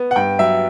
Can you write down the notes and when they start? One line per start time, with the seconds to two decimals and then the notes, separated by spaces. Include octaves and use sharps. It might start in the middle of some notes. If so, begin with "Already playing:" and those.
Already playing: B3
0.11 F#5
0.16 G2 G5
0.39 F#3 E5